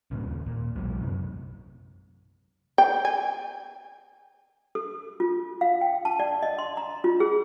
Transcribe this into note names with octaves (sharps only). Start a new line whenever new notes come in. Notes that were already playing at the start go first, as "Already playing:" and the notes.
G2 A#2 C#3
D#1 D#2
A#2
B1 E2 F#3 G#3
F#2 C3
G5
G#5
A4
F4
F5
G5
A5
D5
D#5
C6
A#5
F4
G#4